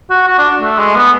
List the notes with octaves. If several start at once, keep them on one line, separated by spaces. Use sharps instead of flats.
F#4
F#4
D4
A3
G#3
B3